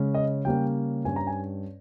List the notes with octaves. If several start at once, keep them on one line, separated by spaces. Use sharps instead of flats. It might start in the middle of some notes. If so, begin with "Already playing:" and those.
Already playing: C#3 G#3 C#4
D#5
C#3 G3 A#3 C#4 G5
G2 G3 C#4 G#5
A#5
G#5